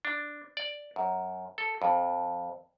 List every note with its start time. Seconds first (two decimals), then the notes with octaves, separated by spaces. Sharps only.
0.05 D4
0.57 D5
0.96 F#2
1.58 A4
1.82 F2